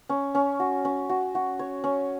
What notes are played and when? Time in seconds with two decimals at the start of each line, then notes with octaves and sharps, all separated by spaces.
0.09 C#4
0.35 C#4
0.60 F#4
0.85 C#4
1.09 F#4
1.35 F#4
1.59 C#5
1.84 C#4